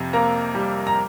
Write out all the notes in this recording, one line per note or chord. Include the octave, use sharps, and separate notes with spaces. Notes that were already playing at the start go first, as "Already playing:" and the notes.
Already playing: F2 C3
A#3 A#5
G3
A#5